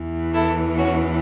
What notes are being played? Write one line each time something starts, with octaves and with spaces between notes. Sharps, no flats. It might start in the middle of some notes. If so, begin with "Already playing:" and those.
Already playing: E2 E3
E4 A4
C#4 F#4